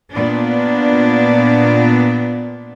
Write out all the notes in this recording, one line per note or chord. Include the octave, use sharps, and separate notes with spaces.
A#2 B3 D4